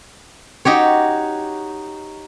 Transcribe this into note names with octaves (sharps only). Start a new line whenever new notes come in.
D#4 F#4 G4 C#5